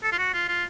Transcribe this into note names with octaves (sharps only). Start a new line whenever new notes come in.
A4
F4
F#4
F4
F4